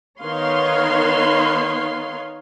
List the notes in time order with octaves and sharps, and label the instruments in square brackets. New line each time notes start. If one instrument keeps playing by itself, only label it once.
[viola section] D#3 B3 B4 C#5 F5 C6